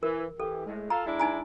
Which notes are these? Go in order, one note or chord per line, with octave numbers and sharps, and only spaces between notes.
E3 A#4
E3 G4 A4
A2 G#3
F4 A4 F5 A#5
G#3 D4 E4
D#4 G#5 A#5